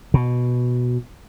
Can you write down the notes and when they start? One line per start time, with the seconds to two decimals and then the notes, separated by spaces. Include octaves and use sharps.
0.14 B2